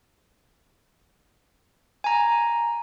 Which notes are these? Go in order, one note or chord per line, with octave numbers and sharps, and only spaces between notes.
G#5 A#5